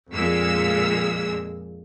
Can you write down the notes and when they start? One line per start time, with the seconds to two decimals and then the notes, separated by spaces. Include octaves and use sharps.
0.12 F2 A#2 G#3 E6